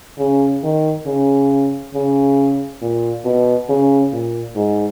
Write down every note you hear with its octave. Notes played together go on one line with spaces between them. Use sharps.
C#3
D#3
C#3
C#3
A#2
B2
C#3
A#2
G#2